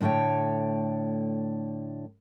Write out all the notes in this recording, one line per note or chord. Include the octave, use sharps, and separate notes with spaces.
A2 D3 A3 C#5 G5